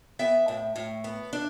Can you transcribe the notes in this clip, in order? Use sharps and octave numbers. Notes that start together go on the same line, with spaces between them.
B3 E5 G5
A2
A2
B3
D4